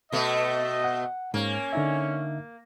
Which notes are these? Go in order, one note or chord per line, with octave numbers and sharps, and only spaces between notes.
B2 A3 D#5
F#5
G#2 A#3 C#4
D3 D#4 E5